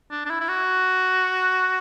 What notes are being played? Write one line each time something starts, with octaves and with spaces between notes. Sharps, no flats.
D4
D4
E4
E4
F#4